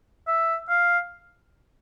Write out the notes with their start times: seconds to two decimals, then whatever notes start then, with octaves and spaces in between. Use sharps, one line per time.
0.27 E5
0.69 F5